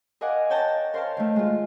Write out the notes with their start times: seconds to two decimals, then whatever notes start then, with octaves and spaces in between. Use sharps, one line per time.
0.21 A#4 D#5 F5 F#5 G#5 D6
0.50 C#5 G5 A5 A#5
0.94 A#4 C5 C#5 F5 G5 A5
1.17 D#3 A3
1.36 G#3 F4